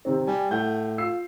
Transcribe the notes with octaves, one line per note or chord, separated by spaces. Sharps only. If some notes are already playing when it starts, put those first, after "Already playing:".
C3 D#3 C4
G3 G#5
A2 F#5 G6
F4 E6 C7